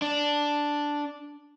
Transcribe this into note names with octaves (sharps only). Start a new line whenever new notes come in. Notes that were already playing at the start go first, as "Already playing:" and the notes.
D4